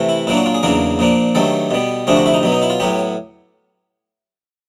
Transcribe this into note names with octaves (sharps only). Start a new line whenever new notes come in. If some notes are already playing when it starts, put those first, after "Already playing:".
Already playing: C3 E3 A3
E4
A#2 F#3 A#3 D4 E4
F#4
F4
G#4
E2 C#3 F#3 A#3 D4 A#4
A#2 F3 A#3 D4
G2 D#3 F#3 A3 A4
B2 G3 B3
D2 C3 F3 A3 D4 G#4
F#4
E4
D#4
B2 F#3 B3
D#4
E4
F4
A2 F#3 B3 G4